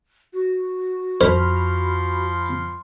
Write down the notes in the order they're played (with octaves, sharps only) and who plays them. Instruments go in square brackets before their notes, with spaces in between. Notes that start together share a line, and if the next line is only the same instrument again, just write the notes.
[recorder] F#4
[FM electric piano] F2 B5 F6 [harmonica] F3 C6 [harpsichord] C5